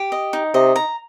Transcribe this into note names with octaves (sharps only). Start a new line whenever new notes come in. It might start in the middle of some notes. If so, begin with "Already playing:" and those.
Already playing: G4
D#5
D#4
C3 D#5
A#5